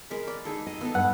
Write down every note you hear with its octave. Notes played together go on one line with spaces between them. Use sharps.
G#3 A#4 B5
D5 B5
D#4 G#4 A4
D#5
B3 A4
G2 F#5